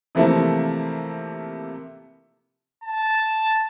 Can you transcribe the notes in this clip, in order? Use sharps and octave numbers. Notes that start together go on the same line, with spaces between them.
C3 E3 F3 A3 A#3 E4
A5